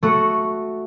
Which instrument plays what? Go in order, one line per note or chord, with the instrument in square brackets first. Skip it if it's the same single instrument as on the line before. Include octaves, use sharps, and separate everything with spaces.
[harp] A3 F#4